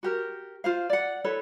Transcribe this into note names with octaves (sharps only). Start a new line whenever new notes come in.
F#4 G4 A#4
F4 C5 F5
D5 F#5
E4 A4 B4 C#5